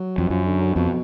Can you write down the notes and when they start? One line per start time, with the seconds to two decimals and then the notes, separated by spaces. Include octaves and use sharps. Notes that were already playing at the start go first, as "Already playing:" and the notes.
Already playing: F#3
0.18 F2
0.30 F#2 F3
0.45 D3
0.60 D3
0.75 F2 B2